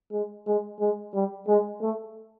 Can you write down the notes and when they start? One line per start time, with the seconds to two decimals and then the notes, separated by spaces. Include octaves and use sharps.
0.12 G#3
0.46 G#3
0.80 G#3
1.14 G3
1.47 G#3
1.81 A3